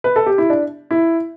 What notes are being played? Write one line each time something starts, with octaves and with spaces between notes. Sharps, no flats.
B4
A4
G4
E4
D4
E4